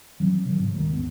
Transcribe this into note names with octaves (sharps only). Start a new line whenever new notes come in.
E3 F#3 B3 C4
C3 D#3 F#3
G#2 C3 F3
D#2 C3 D#3 G#3
G#1 D#2 B3